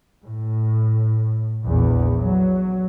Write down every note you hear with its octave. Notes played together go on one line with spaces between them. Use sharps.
A2
A#1 E2
F#3